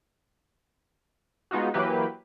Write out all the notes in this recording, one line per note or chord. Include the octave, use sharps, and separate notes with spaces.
G#3 B3 D#4 F4 F#4
E3 F#3 A#3 G4 B4